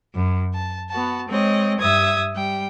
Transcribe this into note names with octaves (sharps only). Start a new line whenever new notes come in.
F#2
A5
B3 F#4 A5
G#3 C4 C#5 D#5
G2 E5 D#6 G#6
G3 G5